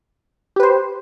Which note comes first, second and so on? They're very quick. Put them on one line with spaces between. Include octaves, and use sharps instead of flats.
G4 B4 C5